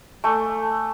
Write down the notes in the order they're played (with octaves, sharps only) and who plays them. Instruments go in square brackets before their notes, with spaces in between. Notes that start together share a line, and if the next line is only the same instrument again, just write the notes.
[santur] A3 [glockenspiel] G#5 C#6 D6